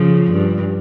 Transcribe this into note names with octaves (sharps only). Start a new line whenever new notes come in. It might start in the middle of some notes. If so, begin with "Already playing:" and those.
Already playing: C#3 F3
G2